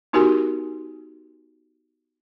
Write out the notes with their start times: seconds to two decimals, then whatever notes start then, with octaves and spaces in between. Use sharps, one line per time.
0.13 B3 D#4 F#4 G4 A#4 G#5